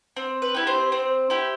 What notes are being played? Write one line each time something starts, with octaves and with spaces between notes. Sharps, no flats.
C4
B4
E4 G4
C4 C5
C4
E4 G4